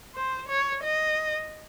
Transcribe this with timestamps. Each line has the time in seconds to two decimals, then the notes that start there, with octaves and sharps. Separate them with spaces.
0.15 C5
0.49 C#5
0.83 D#5